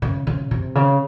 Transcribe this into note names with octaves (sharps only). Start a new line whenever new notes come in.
C#3
C#3
C3
C#3